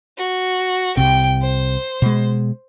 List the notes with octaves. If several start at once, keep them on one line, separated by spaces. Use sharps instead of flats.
F#4
C2 C3 G5
C5
B2 G#3